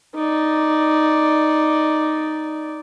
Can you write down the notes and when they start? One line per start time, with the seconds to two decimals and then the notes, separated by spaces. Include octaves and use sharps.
0.15 D#4 D5